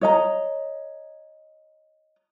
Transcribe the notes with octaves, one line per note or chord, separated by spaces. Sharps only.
C#5 D#5 A#5